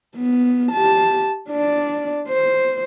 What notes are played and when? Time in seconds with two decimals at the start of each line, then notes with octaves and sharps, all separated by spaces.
0.16 B3
0.71 G4 A5
1.49 D4 D5
2.28 C5